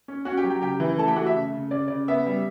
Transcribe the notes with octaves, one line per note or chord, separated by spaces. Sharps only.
C#4
C#4 F#4 F#5
G4 G5
F#3
G4 G5
C#3 G4 G5
E3
A3 A4 A5
G4 G5
A3 F#4 F#5
E5
C#3
C#3
C#3 D5
C#3 D5
B3 E5
G3